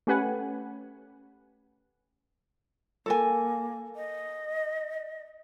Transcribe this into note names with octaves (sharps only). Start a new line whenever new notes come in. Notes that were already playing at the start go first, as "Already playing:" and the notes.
A3 C#4 G4 B4 F#5 G#5
A#3 A4 A#4 G#5
D#5